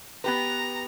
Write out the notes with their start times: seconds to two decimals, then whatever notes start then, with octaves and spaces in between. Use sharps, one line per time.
0.24 B3 G4 B4 A#5